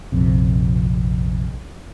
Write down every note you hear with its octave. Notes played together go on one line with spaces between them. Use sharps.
A#1 F2 C3